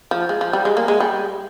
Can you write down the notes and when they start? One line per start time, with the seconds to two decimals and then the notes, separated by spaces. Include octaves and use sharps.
0.11 F3
0.29 G#3
0.41 F3
0.53 G3
0.65 G#3
0.77 A#3
0.88 G#3
1.00 G3